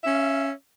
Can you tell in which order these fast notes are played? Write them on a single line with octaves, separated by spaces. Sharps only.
E5 C#4 F5